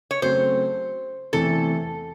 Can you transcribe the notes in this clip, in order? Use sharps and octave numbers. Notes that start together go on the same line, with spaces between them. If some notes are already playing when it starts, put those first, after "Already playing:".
C#5
C#3 F#3 A3 C4 C5
E2 C3 E3 A3 A4